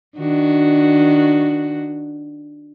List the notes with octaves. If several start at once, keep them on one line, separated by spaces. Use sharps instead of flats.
D#3 D4 F#4